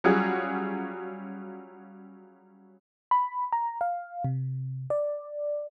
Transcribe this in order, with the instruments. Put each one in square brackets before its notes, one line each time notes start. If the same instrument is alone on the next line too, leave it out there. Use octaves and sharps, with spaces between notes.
[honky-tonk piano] F#3 G3 C#4 F4 F#4 G#4
[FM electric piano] B5
A#5
F5
C3
D5